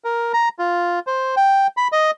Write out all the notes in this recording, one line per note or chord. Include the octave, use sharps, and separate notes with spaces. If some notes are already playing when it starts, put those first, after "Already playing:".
A#4
A#5
F4
C5
G5
B5
D#5